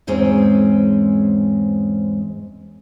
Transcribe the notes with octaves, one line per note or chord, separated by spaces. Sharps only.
E2 G#2 G#3 C4 C#4